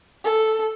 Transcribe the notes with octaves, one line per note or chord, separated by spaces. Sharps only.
A4